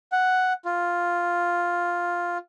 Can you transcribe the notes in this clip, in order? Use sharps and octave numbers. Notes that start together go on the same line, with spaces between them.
F#5
F4